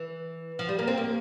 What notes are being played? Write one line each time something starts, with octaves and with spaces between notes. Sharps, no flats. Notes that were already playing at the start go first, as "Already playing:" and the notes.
Already playing: E3
F3
G3
A#3
C4
A#3